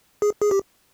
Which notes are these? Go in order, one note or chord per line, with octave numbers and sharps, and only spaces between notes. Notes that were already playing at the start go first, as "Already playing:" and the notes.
G#4
G#4
G4